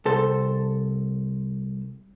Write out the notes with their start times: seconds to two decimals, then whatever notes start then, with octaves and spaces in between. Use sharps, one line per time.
0.05 C2 A4 C5